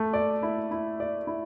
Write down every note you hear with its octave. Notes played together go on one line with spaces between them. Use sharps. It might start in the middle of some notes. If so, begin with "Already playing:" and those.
Already playing: A3
D5
E4
E4
D5
E4